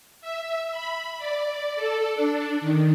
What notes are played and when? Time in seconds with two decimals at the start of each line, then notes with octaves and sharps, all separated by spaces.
0.21 E5
0.72 B5
1.18 D5
1.76 A4
2.15 D4
2.61 D#3